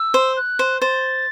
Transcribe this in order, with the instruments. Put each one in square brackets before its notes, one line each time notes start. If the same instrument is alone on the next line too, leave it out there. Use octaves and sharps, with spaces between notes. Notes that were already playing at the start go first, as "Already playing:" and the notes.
Already playing: [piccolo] E6
[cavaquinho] C5
[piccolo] F#6
[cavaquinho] C5
[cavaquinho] C5 [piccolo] A6